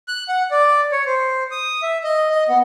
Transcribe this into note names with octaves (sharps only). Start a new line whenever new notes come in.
F#6
F#5
D5
C#5
C5
D#6
E5
D#5
D#5
B3